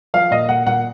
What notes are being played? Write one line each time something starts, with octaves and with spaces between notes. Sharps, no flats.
F3 F5
A#2 D#5
A#2 F#5
A#2 F#5